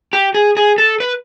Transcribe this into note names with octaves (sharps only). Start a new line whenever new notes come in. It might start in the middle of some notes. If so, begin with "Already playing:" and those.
G4
G#4
G#4
A4
B4